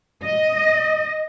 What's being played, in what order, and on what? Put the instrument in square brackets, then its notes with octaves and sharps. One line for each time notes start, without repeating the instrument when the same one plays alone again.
[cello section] D#5